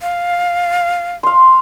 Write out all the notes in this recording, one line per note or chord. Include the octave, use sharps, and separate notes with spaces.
F5
F5 C6